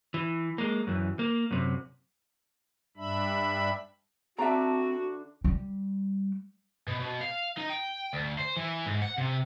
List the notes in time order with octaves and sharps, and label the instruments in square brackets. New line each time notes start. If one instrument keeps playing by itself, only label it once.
[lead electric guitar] E3
G#3 A#3
F#2 E3
A#3
F#2 C3
[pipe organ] G2 G3 D4 E5 B5
[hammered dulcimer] D3 D4 [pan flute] C4 [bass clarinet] F#4 [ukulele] E5 A#5
[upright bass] G3
[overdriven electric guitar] B2
B2
F5
D#4
G5
D2
C5
E3
G#2
F#5
C3